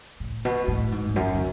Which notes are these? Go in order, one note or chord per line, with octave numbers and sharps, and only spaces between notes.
A2
B2
A2
G#2
E2
F#2
C#3